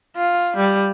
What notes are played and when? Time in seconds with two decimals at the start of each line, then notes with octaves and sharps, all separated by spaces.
0.16 F4
0.56 G3